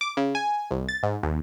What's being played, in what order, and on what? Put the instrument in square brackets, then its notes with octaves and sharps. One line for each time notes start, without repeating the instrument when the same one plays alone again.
[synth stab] D6
C#3
G#5
C2
A6
G#2
D#2